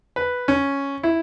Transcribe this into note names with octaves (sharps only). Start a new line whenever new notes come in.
B4
C#4
E4